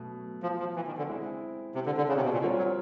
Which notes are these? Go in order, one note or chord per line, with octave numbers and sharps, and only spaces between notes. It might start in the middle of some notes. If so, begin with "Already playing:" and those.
Already playing: B2 F#3 A3
F3
F3
E3
D#3
D3
G#3 C4 E4
C3
D3
D3
C#3
C3
B2
A#2
D3 G3 C4 F4 A#4 C#5
F#3